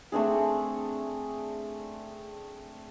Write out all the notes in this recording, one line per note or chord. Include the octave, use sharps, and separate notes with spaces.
A3 C4 D4 G#4